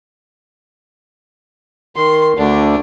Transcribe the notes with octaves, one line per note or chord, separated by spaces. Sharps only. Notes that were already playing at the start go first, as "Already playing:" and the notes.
D#3 C6
D2 D3 D4